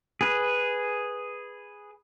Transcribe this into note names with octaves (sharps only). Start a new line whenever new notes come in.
G#4 B4